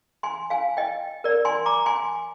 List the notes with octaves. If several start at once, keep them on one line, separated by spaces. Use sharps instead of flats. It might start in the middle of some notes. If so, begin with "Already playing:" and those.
G#5 C6
F5 G#5
D#5 G5
A#4 D5
G#5 C6
A#5 D6
G#5 C6